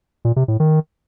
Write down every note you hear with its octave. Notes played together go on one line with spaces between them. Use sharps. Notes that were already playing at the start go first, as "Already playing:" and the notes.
A#2
C3
A2
D#3